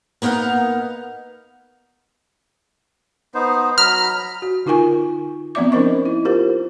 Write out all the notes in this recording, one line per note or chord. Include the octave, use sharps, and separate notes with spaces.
A#3 B3 D#4 F5 F#5
B3 D#4 C5
F#3 A#5 B5 F6
F#4
D3 D#4 F4 A#4 G#5 C#6
F3 B3 C4 D5 E5 D6
C#4 D#4 A#4 C5 D#5 C#6
E4
F4 G4 A#4 C5